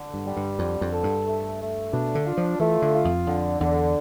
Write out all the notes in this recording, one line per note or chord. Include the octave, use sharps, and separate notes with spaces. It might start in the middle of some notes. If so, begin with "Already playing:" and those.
Already playing: D3
G2
G3
G2
F2 D3
F2
A4
G2
A3
A3
B2 D4
D3
F4
F3
E3 A3
D3
F4
F2
F2 D3
E2 D3